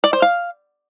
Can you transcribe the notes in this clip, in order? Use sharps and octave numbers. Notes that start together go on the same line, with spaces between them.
D5
C5
F5